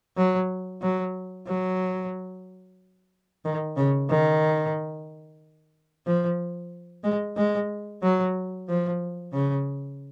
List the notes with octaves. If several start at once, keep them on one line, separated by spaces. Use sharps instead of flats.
F#3
F#3
F#3
D#3
C#3
D#3
F3
G#3
G#3
F#3
F3
C#3